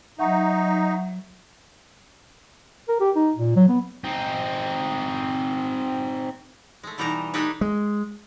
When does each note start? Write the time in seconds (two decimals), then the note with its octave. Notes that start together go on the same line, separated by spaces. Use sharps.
0.19 F#3 D#4 E5 F#5 C#6
2.88 A#4
3.00 G4
3.16 D#4
3.35 A#2
3.56 F#3
3.69 B3
4.04 C4 D#4
6.83 G#3 A3
6.98 B2 E3 G3 D#4 G4 A#5
7.34 A3 D4 D#4 G4 B4 C#5
7.61 G#3